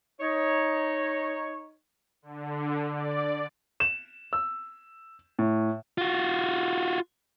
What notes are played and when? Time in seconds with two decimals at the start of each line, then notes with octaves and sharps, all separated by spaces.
0.20 D#4 C#5
2.22 D3
2.90 D5
3.80 E7
4.33 E6
5.39 A2
5.98 F4 F#4